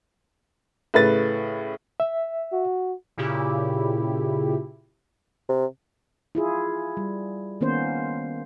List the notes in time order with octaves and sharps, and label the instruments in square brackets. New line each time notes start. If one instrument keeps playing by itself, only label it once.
[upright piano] A2 C#3 B4 A6
[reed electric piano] E5
[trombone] F#4
[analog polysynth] A#2 C#3 E4 G4
[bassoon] C3
[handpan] E4 F4 G#4
G3
D#3 A#3 B3 C#4 C5